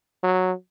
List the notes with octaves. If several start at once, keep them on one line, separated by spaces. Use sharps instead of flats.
F#3